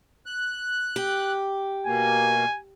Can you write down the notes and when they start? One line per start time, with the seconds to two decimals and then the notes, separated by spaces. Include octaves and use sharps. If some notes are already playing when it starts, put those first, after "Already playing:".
0.26 F#6
0.96 G4
1.87 B2 A#3 G#5